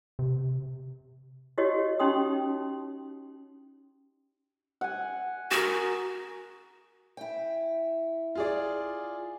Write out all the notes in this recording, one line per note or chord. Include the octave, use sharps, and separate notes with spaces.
C3
E4 F#4 G4 C#5 D#5
C#4 D#4 G4 G5 C6 D#6
F#5 G#5
F#4 G#4 A#4
E4 G5
F4 G#4 D5